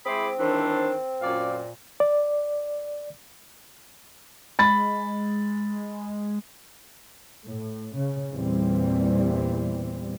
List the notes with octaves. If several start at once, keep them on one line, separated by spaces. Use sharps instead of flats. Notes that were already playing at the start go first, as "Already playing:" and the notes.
G#3 C4 E4 G#4 C5 B5 D6
C#2 D#3 E3 D4 C5
F#2 A#2 D5 F5
D5
G#3 B5 A6
A2
C#3
E2 A#2 E3 G3 C4